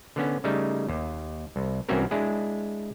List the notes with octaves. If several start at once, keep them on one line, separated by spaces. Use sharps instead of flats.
D3 B3 C#4
C#3 G3 A3 D#4
D#2
C2
C2 E3 C4 C#4 F#4 A#4
G#3 D4 E4 G#4